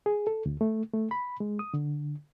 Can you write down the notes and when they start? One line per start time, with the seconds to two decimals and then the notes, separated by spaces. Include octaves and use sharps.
0.06 G#4
0.27 A4
0.46 D2
0.61 A3
0.94 A3
1.11 B5
1.40 G#3
1.59 D#6
1.74 D3